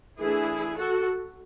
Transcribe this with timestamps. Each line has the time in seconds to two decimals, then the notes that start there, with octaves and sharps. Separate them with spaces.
0.18 E3 A3 D4 E4 G#4
0.77 F#4 A4